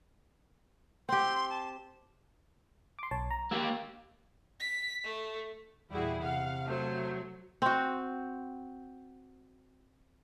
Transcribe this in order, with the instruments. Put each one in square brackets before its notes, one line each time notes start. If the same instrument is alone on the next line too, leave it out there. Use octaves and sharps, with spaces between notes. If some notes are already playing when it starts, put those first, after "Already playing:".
[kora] C4 G4 [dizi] C6
[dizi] A5
[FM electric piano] C6 D6
B1 C#5 A5
A#5
[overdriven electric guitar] A#3 G4 [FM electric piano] E6
[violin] B6
A3
[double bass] E2 A#2 [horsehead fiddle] G3 F#4 [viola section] E4 G#4
[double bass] C3 [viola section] F5 [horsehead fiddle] F#5
[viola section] F#3 [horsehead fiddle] A3 C5
[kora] C4 F#4